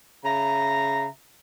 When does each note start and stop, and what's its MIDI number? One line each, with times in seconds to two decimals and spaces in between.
0.25 1.07 49
0.25 1.07 76
0.25 1.07 82